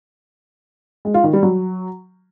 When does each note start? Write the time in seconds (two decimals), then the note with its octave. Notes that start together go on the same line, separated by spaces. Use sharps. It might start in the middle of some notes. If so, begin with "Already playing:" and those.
1.05 G#3
1.14 F4
1.24 D#3
1.33 G3
1.43 F#3